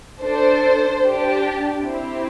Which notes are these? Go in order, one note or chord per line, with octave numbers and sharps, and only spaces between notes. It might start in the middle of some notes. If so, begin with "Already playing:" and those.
D4 A4 C5
D4 G4
C4 E4 G4